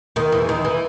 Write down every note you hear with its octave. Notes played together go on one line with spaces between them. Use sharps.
D#2 D#3
E2 E3
D#2 D#3
E3